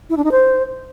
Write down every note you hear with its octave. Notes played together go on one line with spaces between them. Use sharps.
E4
D4
D#4
C5